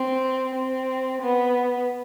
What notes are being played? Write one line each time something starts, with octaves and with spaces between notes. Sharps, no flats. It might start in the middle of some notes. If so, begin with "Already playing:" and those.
Already playing: C4
C4
B3